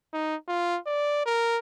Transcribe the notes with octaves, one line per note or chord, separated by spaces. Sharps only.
D#4
F4
D5
A#4